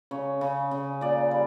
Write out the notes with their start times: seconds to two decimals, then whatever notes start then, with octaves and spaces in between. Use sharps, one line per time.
0.11 C#3 C#5
0.41 C#3
0.71 C#3
1.01 A#2 D5
1.31 G3